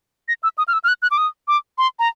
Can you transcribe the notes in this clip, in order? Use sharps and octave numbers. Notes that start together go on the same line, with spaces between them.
A#6
E6
D#6
F6
E6
F6
F#6
F#6
D6
D#6
D6
C6
A#5